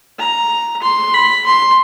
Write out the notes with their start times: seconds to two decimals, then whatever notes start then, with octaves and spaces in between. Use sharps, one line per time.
0.19 A#5
0.82 C6
1.14 B5
1.46 C6